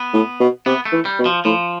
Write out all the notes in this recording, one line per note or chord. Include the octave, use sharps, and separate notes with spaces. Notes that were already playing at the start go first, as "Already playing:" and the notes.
Already playing: B3
A2
B2
C3 B3
A3
E3
G3
B2
F3
A2 F3